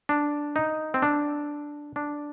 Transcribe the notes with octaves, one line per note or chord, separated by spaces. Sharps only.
D4
D#4
C4
D4
D4